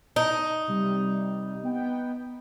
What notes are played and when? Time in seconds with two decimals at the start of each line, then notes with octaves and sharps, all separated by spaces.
0.16 D#4
0.68 C3 G3
1.63 B3 G5